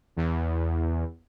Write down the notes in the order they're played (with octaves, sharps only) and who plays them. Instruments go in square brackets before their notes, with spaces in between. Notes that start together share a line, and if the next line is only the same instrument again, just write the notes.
[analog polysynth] E2